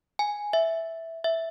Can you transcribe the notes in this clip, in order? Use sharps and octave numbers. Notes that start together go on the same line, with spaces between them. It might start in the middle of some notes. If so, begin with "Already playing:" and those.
G#5
E5
E5